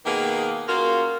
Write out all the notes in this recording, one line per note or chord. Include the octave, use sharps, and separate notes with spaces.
B2 D#3 A#3 B3 G#4 A#4
C#3 A#3 F4 F#4 A#4